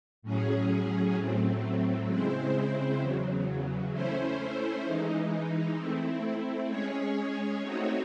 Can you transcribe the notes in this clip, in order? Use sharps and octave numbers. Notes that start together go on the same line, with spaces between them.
A2 F#3 C#4 G#4
A2 F#3 A3 C4
C#3 G#3 C4 E4 C5
E2 C#3 F#3
A3 C#4 E4 C5
E3 G#3 D#4
A3 C4 E4
G#3 C#4 G#4 C#5
A3 C4 D#4 F#4 C#5